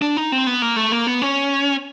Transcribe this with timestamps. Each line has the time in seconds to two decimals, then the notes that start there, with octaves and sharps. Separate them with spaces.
0.02 D4
0.17 D#4
0.32 C4
0.47 B3
0.62 A#3
0.76 A3
0.92 A#3
1.07 B3
1.22 C#4